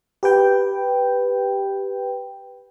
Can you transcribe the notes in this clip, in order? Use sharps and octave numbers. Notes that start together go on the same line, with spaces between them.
G4 B4 G5